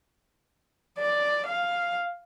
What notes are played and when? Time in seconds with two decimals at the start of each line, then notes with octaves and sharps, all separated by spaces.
0.98 D5
1.46 F5